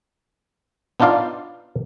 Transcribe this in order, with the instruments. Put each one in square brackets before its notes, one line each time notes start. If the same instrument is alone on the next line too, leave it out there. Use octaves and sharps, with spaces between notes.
[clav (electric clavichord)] B3 D4 D#4 F4 D5 F5